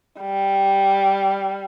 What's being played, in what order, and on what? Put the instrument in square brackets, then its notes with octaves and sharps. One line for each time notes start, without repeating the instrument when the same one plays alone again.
[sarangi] G3